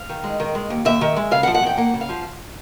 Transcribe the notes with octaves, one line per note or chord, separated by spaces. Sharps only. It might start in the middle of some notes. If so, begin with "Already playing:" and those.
Already playing: F5
D#3
G#3
D#3
G#3
D#2
D#2 E5
D#3
G#3
C#3 F5
F#5
F3
F#5
E2 G5
A#3 F#5
C#3
F5
F3